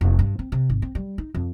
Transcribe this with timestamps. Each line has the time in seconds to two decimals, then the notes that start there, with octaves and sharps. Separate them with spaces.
0.01 F1
0.19 G2
0.39 C4
0.52 C3
0.70 G#1
0.82 C4
0.95 G3
1.18 D#4
1.35 F2